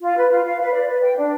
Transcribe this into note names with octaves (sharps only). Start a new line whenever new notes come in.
F4
B4
F4
F5
B4
D5
B4
G5
D4